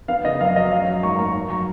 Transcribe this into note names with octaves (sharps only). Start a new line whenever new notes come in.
B3 F5
C#3 D#5
F#2 F5
F#3 D#5
C#4 F5
F#3
G#2 A#5 C#6
A#3 A#5 C#6
D#4
F#3 A#5 C#6